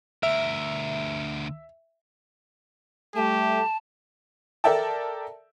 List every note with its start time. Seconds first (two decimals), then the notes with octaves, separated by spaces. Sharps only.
0.23 D2 A#4 E5
3.16 G3 A3 G4 A5
4.64 A4 A#4 D5 E5 G5 A5